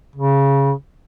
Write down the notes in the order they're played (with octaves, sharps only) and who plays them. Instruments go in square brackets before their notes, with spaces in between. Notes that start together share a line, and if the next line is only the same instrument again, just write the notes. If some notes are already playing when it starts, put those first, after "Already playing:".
[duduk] C#3